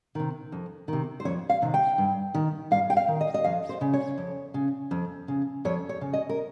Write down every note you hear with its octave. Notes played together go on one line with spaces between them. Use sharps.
C3 D#3
F2
C3 D#3
C5
F2 C#5
F5
C3 D#3
G5
G2
D#3
G2 F5
G5
F5
D#3
D#5
D#5
F2 F5
C5
C#3
C#5
F2
C#3
F2
C#3
F2 C#5
C#5
C#3
D#5
A#4